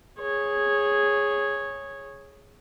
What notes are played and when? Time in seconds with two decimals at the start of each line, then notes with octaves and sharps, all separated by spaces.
0.20 G#4 C#5